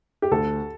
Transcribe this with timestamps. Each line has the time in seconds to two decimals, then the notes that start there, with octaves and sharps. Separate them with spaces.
0.22 G4
0.31 D2 A4